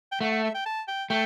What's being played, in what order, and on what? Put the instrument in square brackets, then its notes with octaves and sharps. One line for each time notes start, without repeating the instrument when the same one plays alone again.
[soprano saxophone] G5
[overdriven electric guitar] A3 [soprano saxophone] F#5
[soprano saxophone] F#5
E5
G5
A5
G5
[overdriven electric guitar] A3 [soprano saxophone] G5